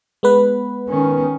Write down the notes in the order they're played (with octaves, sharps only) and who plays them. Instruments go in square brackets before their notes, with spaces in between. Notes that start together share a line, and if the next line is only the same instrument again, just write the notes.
[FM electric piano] G#3 B3 B4
[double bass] D#3 C#4